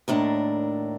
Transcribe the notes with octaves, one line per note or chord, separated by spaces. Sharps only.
D#2 A2 D4 A#4